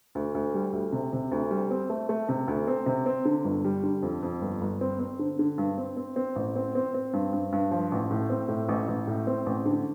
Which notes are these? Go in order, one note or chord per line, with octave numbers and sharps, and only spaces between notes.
D2
D2
G3
D2
C3
C3
D2
G3
C4
A3
A3
C3
D2
C4
C3
C4
D3
G1
G3
D3
F2
F2
G1
G1
C4
C4
D3
D3
G2
C4
C4
C4
A1
C4
C4
C4
G2
G2
G2
F3
A1
A2
C4
A2
A1
A1
A2
C4
A1
D3